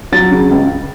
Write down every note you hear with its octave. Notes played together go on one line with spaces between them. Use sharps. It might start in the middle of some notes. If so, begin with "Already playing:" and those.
F#3 A6
C#3
C#2